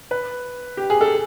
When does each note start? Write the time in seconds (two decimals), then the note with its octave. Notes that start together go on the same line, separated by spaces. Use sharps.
0.11 B4
0.77 G4
0.90 G#4
1.01 A4